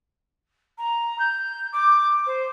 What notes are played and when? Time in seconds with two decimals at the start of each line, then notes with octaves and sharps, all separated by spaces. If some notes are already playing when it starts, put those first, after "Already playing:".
0.78 A#5
1.19 G6
1.73 D6
2.26 C5